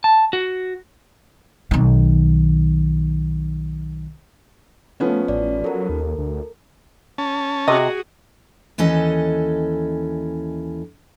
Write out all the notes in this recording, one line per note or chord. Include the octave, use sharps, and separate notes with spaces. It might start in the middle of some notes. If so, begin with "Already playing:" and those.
A5
F#4
B1 D#3
F3 A3 B3 C#4
A1 D5
F#3 A4 A#4
D#2
D2
C#4 A5
C3 F#4 G#4 D#5
D#2 E3 C#4 A4 D#5